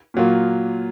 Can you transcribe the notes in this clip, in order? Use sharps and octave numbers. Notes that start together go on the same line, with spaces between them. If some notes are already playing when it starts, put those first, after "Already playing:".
A#2 F#3 A#3 F4